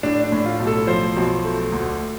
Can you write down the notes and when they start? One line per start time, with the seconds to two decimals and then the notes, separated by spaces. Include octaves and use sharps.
0.03 A2 D4
0.24 D4
0.32 A2
0.45 F4
0.60 B1
0.67 A4
0.87 F3 C5
1.17 B1
1.45 A3
1.72 D2